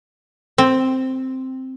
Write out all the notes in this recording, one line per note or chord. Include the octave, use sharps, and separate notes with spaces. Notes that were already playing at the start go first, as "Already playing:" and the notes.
C4